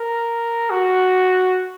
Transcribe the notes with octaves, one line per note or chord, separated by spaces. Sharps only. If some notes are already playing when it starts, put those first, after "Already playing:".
Already playing: A#4
F#4